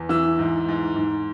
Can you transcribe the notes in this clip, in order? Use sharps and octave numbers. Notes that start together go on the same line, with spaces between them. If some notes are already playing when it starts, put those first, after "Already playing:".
Already playing: E2
E3 E6
G#2
G#2
G#2